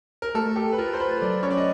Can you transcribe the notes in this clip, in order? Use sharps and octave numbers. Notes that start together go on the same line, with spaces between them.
A#4
A3 A4
G4 A4
B4
F4 A#4
C5
F4 B4
F#3 D5
C#4 C#5
D5
D#5